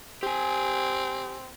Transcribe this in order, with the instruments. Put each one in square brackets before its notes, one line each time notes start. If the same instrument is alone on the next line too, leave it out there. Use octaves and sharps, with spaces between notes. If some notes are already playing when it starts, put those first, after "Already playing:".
[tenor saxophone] C4 [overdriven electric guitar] G4 G#5